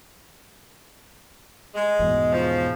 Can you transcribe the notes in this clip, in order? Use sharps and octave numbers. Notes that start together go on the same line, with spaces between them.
G#3
E2 G#2 B2
C#3 F3